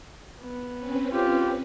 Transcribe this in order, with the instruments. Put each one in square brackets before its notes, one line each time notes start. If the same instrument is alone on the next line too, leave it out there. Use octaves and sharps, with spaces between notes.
[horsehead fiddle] B3
[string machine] C4 C#4 B4
[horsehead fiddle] F4 G4